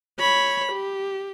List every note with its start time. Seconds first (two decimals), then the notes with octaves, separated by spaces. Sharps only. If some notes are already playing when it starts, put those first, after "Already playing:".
0.19 C#5 B5
0.72 G4